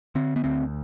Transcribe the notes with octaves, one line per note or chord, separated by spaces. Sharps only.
D3 C4
B3
D2 C4